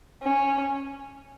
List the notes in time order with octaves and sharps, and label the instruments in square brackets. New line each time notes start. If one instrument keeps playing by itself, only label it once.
[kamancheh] C#4